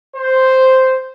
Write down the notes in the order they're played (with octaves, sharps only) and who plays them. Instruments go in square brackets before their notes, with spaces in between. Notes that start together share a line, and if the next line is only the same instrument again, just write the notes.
[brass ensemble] C5